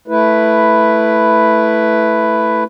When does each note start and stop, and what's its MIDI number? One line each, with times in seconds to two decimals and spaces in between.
0.08 2.64 57
0.08 2.64 64
0.08 2.64 71